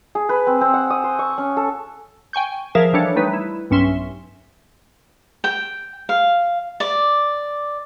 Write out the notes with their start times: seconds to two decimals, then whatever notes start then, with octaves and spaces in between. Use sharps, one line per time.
0.15 G#4
0.29 B4
0.47 C4
0.61 C4
0.74 F#5
0.90 D#6
1.04 C5
1.19 C#6
1.38 C#4
1.57 A4
2.33 G5 G#5 C#6 G6
2.75 F3 G#4 A#4 E5 F5
2.93 E3 G3 D4 A4 C#5
3.16 G3 A3 D#4 B4
3.34 E4
3.70 B1 G2 C#4 E5 C6
5.44 G5
6.09 F5
6.80 D5